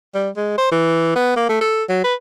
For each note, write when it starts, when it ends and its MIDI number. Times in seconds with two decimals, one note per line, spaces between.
0.14 0.29 55
0.37 0.53 56
0.58 0.68 72
0.72 1.12 52
1.15 1.32 59
1.36 1.48 58
1.49 1.59 57
1.61 1.84 69
1.89 2.01 54
2.04 2.14 71